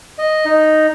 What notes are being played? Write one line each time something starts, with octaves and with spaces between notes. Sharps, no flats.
D#5
D#4